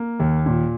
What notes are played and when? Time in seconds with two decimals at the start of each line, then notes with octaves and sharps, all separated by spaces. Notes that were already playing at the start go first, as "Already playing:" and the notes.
Already playing: A#3
0.20 D#2
0.46 A#2